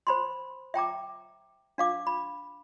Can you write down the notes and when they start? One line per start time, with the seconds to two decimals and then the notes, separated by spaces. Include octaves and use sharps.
0.07 C5 B5 C6
0.74 E5 G5 A#5 D6
1.78 D4 F5 D6
2.07 B5